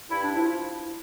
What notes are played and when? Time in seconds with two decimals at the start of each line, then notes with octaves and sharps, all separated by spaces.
0.09 G2 E4
0.22 D4
0.35 F3 E4